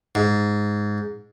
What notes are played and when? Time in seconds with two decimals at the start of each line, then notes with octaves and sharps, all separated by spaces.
0.15 G#2